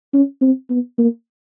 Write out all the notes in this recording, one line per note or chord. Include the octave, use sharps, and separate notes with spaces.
C#4
C4
B3
A#3